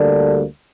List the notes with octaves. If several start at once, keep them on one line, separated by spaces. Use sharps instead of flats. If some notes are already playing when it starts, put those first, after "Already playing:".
Already playing: D2 D3 G3 A#3 D4